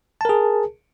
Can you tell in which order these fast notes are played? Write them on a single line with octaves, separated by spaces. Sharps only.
A5 A#4 G#4